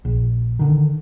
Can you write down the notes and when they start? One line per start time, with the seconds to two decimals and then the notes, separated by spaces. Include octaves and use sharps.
0.05 A#1
0.59 D3 D#3